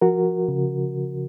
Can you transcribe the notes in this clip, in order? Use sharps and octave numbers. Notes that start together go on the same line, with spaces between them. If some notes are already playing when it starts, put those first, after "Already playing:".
F3 F#4 A#4
C#3